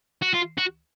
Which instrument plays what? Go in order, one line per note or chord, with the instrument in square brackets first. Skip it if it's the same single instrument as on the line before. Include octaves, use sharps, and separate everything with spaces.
[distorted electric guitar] F#4
F4
F#4